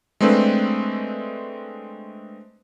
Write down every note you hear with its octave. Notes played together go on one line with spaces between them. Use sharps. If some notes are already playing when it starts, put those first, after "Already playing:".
G#3 A3 C4 D4 B4 E5